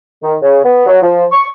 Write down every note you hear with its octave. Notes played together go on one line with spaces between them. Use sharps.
D#3
C#3
B3
F#3
F3
C#6